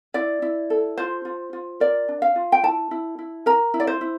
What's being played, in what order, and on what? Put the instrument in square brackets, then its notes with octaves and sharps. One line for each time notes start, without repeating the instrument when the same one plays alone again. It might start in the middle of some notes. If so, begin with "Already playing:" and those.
[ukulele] E4 D5
E4
A4
F4 C5
F4
F4
A#4 D5
D4
F5
F4
G5
E4 A5
E4
E4
A#4 A#5
E4
D5
C5
E4